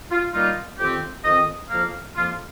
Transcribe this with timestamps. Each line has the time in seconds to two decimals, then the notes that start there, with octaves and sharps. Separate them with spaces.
0.11 F4
0.33 D#3 G3 A#3 D#4 F4
0.79 F2 D#3 C4 G4
1.24 F2 D#3 C4 D#5
1.69 F2 F3 A#3 F5
2.14 F2 F3 A#3 F4